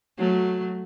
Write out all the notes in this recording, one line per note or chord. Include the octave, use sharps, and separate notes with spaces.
F#3 A3